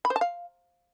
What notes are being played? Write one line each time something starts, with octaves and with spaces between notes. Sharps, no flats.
B5
C5
A5
F5